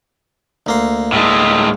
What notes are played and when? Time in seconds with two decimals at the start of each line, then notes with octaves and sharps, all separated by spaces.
0.66 D2 A#3 C6
1.12 A2 G#3